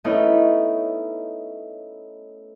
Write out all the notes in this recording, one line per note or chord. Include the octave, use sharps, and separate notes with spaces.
A3 B3 C#4 D#4 E4